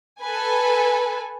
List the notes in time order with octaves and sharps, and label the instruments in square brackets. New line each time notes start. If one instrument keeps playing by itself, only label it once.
[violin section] A4 B4 G#5